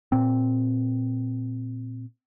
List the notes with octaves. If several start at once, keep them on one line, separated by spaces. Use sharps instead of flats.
A#2 C4